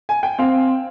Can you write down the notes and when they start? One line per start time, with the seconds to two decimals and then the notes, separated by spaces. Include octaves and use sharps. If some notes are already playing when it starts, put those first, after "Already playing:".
0.09 G#5
0.23 G5
0.38 C4 F5